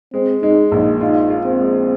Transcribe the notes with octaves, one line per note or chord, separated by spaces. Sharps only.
G#3 C4
G#3 D#4
A#1 D#4
D#4 F4
F4
C4
G#3